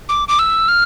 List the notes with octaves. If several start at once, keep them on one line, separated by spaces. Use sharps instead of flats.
D6
D6
E6
F6